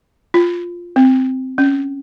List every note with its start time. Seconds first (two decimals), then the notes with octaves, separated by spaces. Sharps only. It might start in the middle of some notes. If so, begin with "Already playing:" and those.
0.34 F4
0.96 C4
1.58 C#4